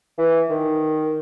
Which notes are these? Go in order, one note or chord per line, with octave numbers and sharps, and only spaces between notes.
E3
D#3